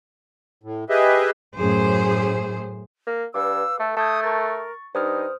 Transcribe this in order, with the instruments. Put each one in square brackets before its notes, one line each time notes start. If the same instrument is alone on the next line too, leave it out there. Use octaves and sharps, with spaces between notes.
[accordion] A2
G4 G#4 B4 D#5 E5
[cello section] F#2 A2 G#4 C5
[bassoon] A#3
[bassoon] G2 [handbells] B4 F5 D6 [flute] E6
[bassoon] A3 [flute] A4
[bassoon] A3 [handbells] A5 G6 G#6 [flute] D#6
[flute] A#4 [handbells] C#6 A6
[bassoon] G2 [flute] D#4 [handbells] C5 D#6 F6